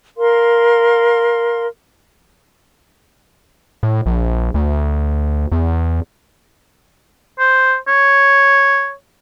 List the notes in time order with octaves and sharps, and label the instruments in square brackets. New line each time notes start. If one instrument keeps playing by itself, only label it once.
[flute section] A#4 F5 C6
[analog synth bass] A2
A#1
D2
E2
[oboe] C5
C#5